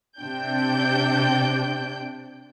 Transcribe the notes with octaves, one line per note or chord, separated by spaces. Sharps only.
C3 D4 G5 G6